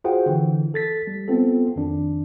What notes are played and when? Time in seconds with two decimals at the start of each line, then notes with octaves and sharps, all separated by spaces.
0.04 F4 F#4 G#4 C5 F#5 G5
0.26 D3 E3
0.74 A4 A6 B6
1.07 G3
1.28 B3 C4 F4 A4
1.76 F2 D#3 D4